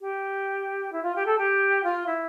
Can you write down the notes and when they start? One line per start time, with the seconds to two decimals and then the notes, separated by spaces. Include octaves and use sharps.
0.01 G4
0.92 E4
1.03 F4
1.15 G4
1.25 A4
1.38 G4
1.83 F4
2.06 E4